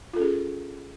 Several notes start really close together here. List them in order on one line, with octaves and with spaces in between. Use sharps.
F4 A4 C#4 G#4